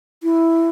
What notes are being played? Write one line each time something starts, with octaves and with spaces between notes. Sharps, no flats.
E4